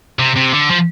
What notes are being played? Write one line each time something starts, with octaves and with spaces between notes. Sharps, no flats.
C3
C3
D3
F3